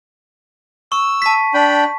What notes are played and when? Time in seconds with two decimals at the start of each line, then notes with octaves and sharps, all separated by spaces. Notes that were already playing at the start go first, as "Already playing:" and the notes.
0.92 C#6 E6
1.22 A5 B6
1.54 D4 G5 B5